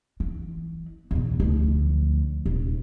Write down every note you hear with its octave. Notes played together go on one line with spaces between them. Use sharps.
E3
E2 B2
D2 F3
D#1